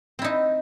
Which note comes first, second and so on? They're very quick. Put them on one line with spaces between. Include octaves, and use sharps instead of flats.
C4 E4 D#4